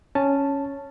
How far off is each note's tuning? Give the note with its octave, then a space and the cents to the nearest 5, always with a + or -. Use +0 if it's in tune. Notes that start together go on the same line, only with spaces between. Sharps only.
C#4 +0 A5 +0